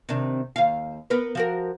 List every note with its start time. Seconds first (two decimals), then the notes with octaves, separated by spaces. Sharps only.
0.09 C3 D#3 D4
0.56 D#2 F5
1.10 B3 A#4 B4
1.35 F3 F#4 A#4